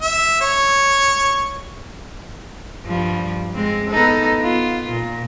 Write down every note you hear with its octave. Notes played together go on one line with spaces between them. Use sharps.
E5
C#5
G2 F3 G3
G#3 C4
B3 D#4 A4
B3 F4
A#2